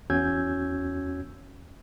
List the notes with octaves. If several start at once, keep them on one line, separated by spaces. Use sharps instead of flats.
E2 C#4 F#4 E6 G6 G#6